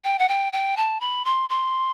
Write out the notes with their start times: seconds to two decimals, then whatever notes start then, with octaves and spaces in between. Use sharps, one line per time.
0.04 G5
0.19 F#5
0.29 G5
0.53 G5
0.77 A5
1.00 B5
1.25 C6
1.49 C6